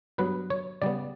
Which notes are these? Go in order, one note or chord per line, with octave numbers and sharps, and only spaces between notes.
G2 F#3 B3 B4
C#5
C#3 G3 B3 D5